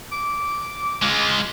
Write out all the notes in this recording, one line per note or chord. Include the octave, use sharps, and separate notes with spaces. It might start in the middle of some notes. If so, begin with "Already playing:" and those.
D6
G#3 F4